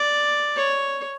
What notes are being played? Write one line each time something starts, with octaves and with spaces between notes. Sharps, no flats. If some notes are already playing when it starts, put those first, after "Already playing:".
Already playing: D5
C#5